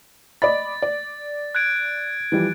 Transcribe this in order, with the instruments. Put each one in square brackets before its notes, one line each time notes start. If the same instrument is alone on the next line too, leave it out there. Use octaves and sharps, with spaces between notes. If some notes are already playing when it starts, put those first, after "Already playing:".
[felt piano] D5 D#5 B5 [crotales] A6
[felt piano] D5
[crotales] F#6 G#6 D7
[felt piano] E3 F3 G3